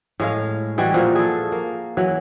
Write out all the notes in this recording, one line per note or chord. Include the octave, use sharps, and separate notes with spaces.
A2 G#3 F5
E3 G3 G#3 F#4
A#2 F3 F#4
G#4 A4
A#3
E3 F#3